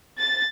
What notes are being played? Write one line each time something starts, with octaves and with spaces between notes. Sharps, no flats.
A6